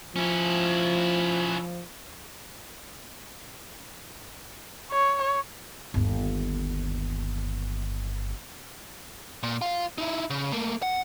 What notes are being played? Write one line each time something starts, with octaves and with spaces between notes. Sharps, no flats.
F3 C#4 E4
C#5
G1 D#2
A#2
F4 F5
D#4 E4
C#3
A3 A#3
F#5